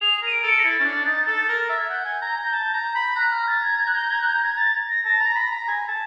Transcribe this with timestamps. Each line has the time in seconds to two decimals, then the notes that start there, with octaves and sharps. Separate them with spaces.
0.01 G#4 F7
0.22 A#4 D#7
0.33 D7
0.43 A4
0.49 C#7
0.59 A#6
0.64 E4 A6
0.80 C#4
0.85 D4
1.06 D#4
1.27 A4
1.49 A#4
1.65 E5 A6
1.78 G#6
1.89 F#5 G6
2.05 G#5
2.22 A#5
2.38 A#5
2.52 A5
2.74 A#5
2.95 B5
3.16 A#5 F#6
3.32 F6
3.48 A6
3.63 G#6
3.79 G#6
3.87 F#6
3.95 G6
4.06 G6
4.10 G#6
4.21 F#6
4.26 G6
4.42 G#6
4.58 A6
4.89 A#6
5.05 A5 A#6
5.16 A#5 A6
5.27 A#6
5.36 B5
5.52 A#5
5.68 G#5
5.88 A5